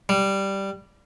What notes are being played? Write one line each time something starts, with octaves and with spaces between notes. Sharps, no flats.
G3